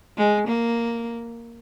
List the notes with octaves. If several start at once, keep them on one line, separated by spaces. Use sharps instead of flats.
G#3
A#3